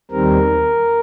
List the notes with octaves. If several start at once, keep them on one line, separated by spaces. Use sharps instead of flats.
D#2 D#3 G3 C4 A#4